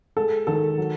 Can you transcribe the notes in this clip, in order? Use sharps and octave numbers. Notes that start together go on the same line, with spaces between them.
G#3 A4
D#3 A4
F#3